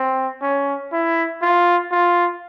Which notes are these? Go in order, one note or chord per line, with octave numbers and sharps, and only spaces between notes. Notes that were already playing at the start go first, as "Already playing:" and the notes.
Already playing: C4
C#4
E4
F4
F4